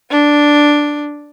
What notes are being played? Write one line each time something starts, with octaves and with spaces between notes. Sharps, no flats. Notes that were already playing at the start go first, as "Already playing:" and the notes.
D4